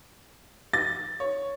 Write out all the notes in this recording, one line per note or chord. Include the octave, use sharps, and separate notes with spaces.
A6
C#5